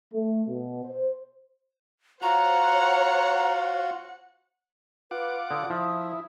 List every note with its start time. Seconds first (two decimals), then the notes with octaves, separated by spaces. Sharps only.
0.12 A3
0.48 B2
0.84 C5
2.22 F4 F#4 C5 C#5 F#5 A#5
5.11 F4 B4 F#5 D6
5.51 D3 D#6
5.70 F3 E4